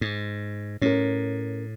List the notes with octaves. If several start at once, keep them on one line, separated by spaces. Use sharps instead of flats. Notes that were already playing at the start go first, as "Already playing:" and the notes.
G#2
A2 C#4 A#4